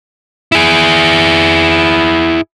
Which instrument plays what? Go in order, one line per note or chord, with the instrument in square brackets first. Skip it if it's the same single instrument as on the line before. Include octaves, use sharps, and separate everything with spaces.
[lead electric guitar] E4 G#4